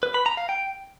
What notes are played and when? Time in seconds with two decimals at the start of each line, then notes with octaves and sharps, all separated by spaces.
0.03 B4
0.14 B5
0.26 A#5
0.37 F5
0.49 G5